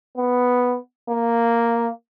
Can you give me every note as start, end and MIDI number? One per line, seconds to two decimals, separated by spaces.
0.17 0.78 59
1.09 1.89 58